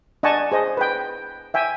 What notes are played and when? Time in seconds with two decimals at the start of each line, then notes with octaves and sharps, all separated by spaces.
0.23 D4 D#5 F#5 G#5 A5 C#6
0.52 G#4 C5 D#5
0.77 B4 G5
1.54 E5 G5 G#5